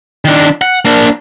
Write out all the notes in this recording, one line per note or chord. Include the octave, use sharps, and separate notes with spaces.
D#3 D4
F#5
A#3 D4